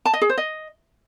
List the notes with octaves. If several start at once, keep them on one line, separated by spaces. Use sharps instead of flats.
A5
D#5
G#4
C5
D#5